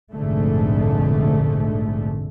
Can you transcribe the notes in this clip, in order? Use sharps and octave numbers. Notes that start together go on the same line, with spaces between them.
F1 A#1 G#2 D3 A3